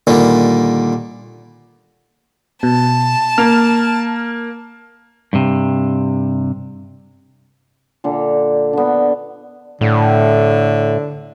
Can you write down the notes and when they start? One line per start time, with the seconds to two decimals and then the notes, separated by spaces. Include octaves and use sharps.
0.07 A#2 D3 D#3 G3
2.63 B2 A5
3.38 A#3 F6
5.33 G2 C3
8.04 A#2 D3
8.73 D3 B3
9.81 A2 D3